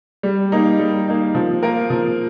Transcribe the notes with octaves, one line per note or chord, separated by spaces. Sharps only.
G3
A#3 D#4
G3
A#3 D#4
F3
A#3 F4 A#4
F3